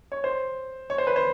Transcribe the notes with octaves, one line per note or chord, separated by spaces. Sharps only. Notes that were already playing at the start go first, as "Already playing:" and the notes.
C#5
C5
C#5
C5
B4
C5